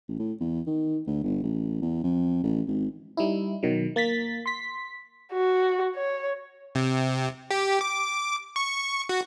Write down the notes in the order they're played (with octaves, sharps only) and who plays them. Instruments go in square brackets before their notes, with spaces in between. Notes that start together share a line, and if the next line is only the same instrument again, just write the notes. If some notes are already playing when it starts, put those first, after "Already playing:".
[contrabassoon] A1
A2
E2
D#3
D2
G1
A1
E2
F2
A1
G#1
[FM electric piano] G3 D#4 E4
B2 D#3 F#3
A#3 A6 B6
C6 B6
[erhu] F#4
C#5
[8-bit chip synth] C3
G4
D6
C#6
F#4